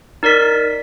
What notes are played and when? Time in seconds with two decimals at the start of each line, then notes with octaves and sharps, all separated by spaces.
0.23 D#4 A#4 D5 B6